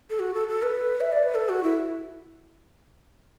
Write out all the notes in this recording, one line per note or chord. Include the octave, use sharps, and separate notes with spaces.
A4
F#4
A4
A4
B4
E5
D5
B4
A4
F#4
E4